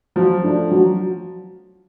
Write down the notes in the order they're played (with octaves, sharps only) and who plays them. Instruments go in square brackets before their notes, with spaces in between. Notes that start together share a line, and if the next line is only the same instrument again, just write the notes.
[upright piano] F3 [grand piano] F#3
[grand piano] A3 D4
F#3